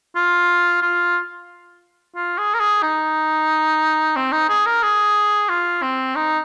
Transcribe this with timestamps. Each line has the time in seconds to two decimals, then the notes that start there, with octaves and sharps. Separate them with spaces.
0.16 F4
0.82 F4
2.16 F4
2.38 G#4
2.54 A#4
2.60 G#4
2.82 D#4
4.16 C4
4.32 D#4
4.49 G#4
4.66 A#4
4.83 G#4
5.49 F4
5.83 C4
6.16 D#4